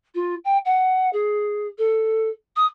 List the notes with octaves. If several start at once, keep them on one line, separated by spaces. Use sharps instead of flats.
F4
G5
F#5
G#4
A4
D#6